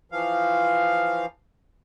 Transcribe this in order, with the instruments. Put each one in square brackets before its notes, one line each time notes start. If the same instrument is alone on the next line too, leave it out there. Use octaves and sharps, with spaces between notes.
[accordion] E3 F3 F5